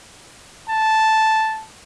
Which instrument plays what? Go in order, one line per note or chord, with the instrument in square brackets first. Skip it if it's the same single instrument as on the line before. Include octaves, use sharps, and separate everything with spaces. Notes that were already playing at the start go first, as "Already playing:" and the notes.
[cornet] A5